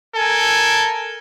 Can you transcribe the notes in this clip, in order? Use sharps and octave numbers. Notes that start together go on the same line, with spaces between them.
A4 A#4 G#5